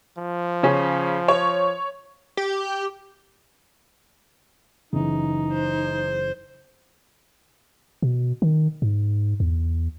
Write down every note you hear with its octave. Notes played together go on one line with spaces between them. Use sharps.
F3
C#3 C#4
C#5
G4
F#1 C#3 E3 D#4
C5
B2
D#3
G#2
E2